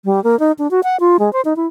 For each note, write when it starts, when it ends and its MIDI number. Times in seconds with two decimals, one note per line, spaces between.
0.05 0.22 55
0.24 0.38 58
0.39 0.52 63
0.59 0.70 62
0.71 0.81 66
0.84 0.97 78
1.00 1.17 65
1.19 1.32 56
1.33 1.41 72
1.45 1.56 63
1.56 1.66 64